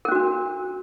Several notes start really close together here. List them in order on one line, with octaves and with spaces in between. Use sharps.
A#4 C#4 F#4 D4